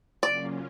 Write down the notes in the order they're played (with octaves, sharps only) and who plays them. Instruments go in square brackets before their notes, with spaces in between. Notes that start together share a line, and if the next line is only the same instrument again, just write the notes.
[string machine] C#3 F#3 A#3 C#4 F4 [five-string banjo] D5